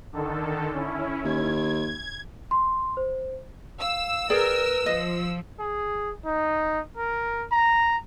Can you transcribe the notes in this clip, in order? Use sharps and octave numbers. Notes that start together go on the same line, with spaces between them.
D3 D#3 A4
C#4 E4
D#2 G#6
C6
C5
F5 E6
G#4 A#4 B4 D5 G5
F3 D#5
G#4
D#4
A#4
A#5